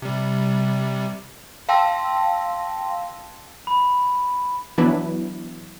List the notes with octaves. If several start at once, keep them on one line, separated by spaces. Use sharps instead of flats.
C3 G3
F5 G5 A5 C6 E6 A#6
B5
E3 F#3 B3 D4 E4 B4